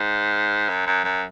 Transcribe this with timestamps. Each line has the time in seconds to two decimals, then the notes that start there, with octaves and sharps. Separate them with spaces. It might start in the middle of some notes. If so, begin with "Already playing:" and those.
Already playing: G#2
0.69 F#2
0.87 F#2
1.04 F#2